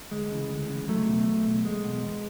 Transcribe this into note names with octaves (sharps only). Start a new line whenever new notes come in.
D2 G#3
C#3 E3
D2
C#3 E3
E2 F#3 A3
B2
E2
B2
E2 G#3
B2
E2